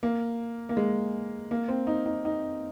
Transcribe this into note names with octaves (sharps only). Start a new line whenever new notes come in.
A#3
A#3
G#3
A#3
C4
D#4
D#4
D#4